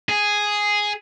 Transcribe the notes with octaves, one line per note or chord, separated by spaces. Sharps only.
G#4